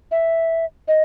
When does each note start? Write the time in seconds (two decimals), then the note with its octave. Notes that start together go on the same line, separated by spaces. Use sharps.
0.11 E5
0.88 D#5